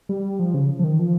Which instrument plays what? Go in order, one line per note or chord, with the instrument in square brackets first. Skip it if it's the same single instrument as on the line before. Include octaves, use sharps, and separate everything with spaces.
[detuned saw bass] G3
F3
C#3
F3
D#3
F3